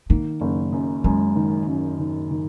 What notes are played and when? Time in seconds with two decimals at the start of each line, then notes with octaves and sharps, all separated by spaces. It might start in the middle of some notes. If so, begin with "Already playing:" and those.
0.09 D#3 A#3
0.41 F#1
0.72 F#2
1.04 F#2 G#3
1.36 D#3
1.67 F#2
2.00 D#3
2.31 D#3